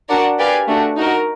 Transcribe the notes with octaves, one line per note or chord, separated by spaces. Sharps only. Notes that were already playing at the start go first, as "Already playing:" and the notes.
D4 F#4 A#4 D5 F#5
G4 B4 D5 F5 G#5
A3 D4 F#4
D#4 F#4 A#4